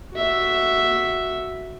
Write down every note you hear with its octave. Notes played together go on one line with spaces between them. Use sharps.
F#4 E5